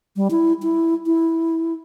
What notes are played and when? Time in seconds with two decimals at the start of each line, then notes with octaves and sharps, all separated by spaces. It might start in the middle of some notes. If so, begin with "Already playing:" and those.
0.16 G3
0.31 E4
0.62 E4
1.06 E4